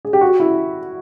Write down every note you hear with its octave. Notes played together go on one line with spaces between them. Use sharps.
G#4
G4
F#4
E4